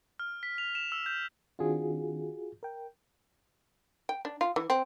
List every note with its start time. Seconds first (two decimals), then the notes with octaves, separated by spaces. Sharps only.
0.19 F6
0.43 B6
0.58 F7
0.75 E7
0.92 E6
1.06 G6
1.59 D#3 C4 D4 F4 F#4 G#4
2.63 A#4 G5
4.09 G5
4.25 D4
4.41 F4
4.56 E3
4.70 C4